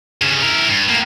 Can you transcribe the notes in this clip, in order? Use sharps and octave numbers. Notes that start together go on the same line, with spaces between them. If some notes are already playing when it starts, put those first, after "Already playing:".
G2 C#3
E3 A#4
G2
A2 A#3